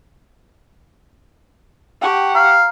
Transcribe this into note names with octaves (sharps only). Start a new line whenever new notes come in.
G4 F#5 G5 A5 C#6
F5 A#5